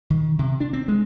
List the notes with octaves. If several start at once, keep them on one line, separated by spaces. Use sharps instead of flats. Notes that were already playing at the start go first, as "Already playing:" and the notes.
D#3
C3
D4
C4
G#3